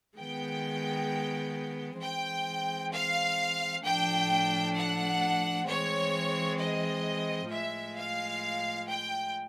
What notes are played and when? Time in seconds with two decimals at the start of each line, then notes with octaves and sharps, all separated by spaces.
0.18 D#3 G#3 B3 G5
2.01 E3 G#3 C4 G5
2.93 F5
3.85 A2 F3 A3 D4 G5
4.77 F#5
5.68 E3 G#3 C4 C#5
6.59 D#5
7.51 A2 F3 G#3 E5
7.97 F5
8.89 G5